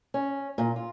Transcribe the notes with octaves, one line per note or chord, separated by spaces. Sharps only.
C#4
A#2
F4